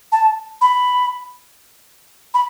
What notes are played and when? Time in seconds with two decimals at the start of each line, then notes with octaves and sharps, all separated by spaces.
0.12 A5
0.61 B5
2.34 B5